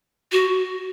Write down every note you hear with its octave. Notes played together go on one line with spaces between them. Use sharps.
F#4